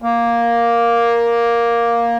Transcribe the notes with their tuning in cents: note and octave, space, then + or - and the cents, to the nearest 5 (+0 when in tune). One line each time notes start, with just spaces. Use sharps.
A#3 +5